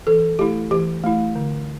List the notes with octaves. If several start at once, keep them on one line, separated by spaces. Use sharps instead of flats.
E3 A4
A3 E4 G4
E3 G4
A3 E4
D3